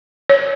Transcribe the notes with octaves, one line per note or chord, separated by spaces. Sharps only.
C#5